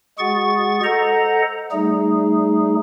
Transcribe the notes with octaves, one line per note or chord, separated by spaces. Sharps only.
G#3 F#4 G#4 F#5 C#6 A6
A4 C5 D#5 F#5 A#5
G3 A3 D#4 G#4